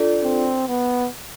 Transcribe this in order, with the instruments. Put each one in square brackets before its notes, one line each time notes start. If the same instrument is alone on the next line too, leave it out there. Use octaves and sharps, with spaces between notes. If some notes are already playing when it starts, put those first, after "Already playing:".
Already playing: [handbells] D4 F4 A4 D5
[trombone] C4
B3